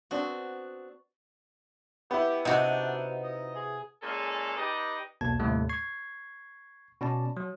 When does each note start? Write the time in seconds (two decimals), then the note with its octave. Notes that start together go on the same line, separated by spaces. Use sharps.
0.11 B3 C4 D4 F#4
2.11 B3 E4 G4
2.45 C3 D4 D#4 F#4
3.23 D#5
3.56 G#4
4.02 A#2 G#3 C#4 G#4 A4 F5
4.57 D#4 G4 B4 D5 D#5
5.21 B1 E2 B2 A#3 A5 G#6
5.40 D#2 A2 C3 G3 A3
5.69 C#6 G#6 C7
7.01 B2 C#4 D5 A5
7.37 F#3